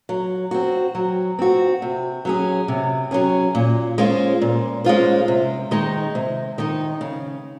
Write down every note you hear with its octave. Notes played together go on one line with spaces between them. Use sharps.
F#3
C4 F#4
F#3
C4 F#4
C3
F#3 C#4 G#4
C3
F#3 C#4 G#4
A#2
G#3 C#4 F4 C5
A#2
G#3 C#4 F4 C5
C3
D#3 G#3 D#4
C3
D#3 G#3 D#4
C#3